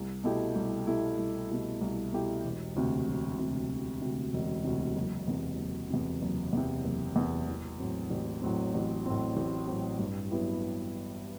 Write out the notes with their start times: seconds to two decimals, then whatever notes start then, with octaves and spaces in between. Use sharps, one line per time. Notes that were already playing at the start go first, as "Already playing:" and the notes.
Already playing: C2
0.24 B2 A3 E4 G4
0.56 C2
0.87 B2 A3 E4 G4
1.19 C2
1.50 B2 A3 E4 G4
1.81 C2
2.13 B2 A3 E4 G4
2.45 E1
2.76 D2 C3
3.08 E1
3.39 D2 C3
3.70 E1
4.02 D2 C3
4.34 E1
4.64 D2 C3
4.96 F#1
5.28 E2 C3
5.59 F#1
5.90 E2 C3
6.22 F#1
6.53 E2 C3
6.84 F#1
7.16 E2 C3
7.48 A1
7.80 A2 F#3 C4
8.10 A1
8.42 A2 F#3 C4
8.74 A1
9.06 A2 F#3 C4
9.37 A1
9.68 A2 F#3 C4
9.99 G2
10.31 F#3 B3 E4 G4